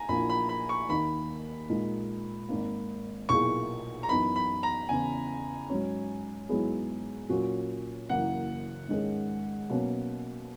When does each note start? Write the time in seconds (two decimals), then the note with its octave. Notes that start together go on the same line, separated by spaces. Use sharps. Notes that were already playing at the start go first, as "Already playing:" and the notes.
Already playing: G#5 A#5
0.09 A#1 A#2 A#3 E4 B5
0.29 B5
0.49 B5
0.69 C#6
0.89 D#2 D#3 A#3 D#4 B5
1.69 A#2 G#3 D#4
2.49 G#1 G#2 D#3 A#3
3.29 B1 A#2 A#3 E4 G#4 C#6
4.03 A#5
4.09 F#2 E3 B3 D#4 B5
4.36 B5
4.63 A#5
4.89 E2 C#3 E3 G#5
5.69 G#2 F#3 C#4
6.49 G#2 F#3 B3 E4 G#4
7.29 A#2 F#3 C#4 F#4
8.09 F#1 F#2 E3 A#3 E4 F#5
8.89 G#2 D#3 G#3 C#4 G#4
9.70 B2 F#3 A#3 C#4